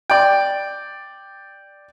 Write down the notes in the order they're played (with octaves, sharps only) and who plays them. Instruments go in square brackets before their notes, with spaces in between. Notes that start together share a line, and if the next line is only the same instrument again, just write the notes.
[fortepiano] D5 G5